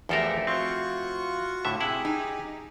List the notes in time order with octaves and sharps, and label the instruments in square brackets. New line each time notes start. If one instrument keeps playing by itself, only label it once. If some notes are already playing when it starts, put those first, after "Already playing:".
[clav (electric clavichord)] E2 A4 A#4 [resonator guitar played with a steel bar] F3 A3 G4
[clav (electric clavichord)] C4 [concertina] F4 F#4 C#6
[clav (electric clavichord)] A2 D3 E5
[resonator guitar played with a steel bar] C3 [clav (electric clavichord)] E4 F#5 [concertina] G4 G#4
[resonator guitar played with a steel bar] D#4